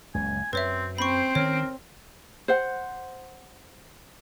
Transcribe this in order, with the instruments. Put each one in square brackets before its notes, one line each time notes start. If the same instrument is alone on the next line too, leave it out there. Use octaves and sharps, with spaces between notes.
[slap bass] F#1 C#2 [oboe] G#5
[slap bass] F#2 [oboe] C4 [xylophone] B4 C#5 E5
[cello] C4 [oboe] C5 [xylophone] B5 C#6
[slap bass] D#3 C#4 [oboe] A#4 [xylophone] C#5
[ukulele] C5 F#5